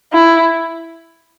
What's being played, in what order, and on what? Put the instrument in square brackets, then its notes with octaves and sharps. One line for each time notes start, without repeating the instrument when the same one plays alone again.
[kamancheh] E4